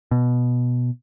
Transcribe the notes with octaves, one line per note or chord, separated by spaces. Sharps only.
B2